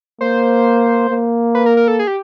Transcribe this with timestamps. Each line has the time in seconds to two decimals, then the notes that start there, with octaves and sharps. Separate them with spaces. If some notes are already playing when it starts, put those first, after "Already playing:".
0.21 A#3 C5
1.10 A#3
1.55 B4
1.66 A#4
1.77 A#4
1.88 A4
1.99 G#4
2.07 G4